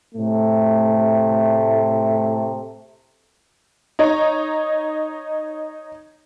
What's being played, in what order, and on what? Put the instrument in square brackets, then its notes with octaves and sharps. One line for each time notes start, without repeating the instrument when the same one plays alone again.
[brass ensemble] A2 C3 A3
[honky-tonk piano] D#4 C#5 D#5 A#5